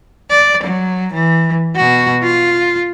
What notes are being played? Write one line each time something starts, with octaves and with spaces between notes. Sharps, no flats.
D5
F#3
E3
B2 F#4
F4